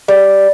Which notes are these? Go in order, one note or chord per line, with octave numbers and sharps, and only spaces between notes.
G3